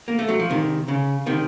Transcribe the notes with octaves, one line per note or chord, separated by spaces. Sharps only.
A#3
A3
F#3
F3
C3 D#3
C#3
C3 D#3